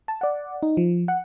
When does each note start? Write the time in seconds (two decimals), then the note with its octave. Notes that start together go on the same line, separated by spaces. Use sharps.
0.08 A5
0.21 D5 F#5
0.63 D#4
0.77 F3
1.08 F#5